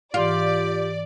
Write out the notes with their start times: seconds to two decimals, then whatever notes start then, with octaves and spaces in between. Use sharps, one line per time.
0.14 G#2 E3 F4 G4 D5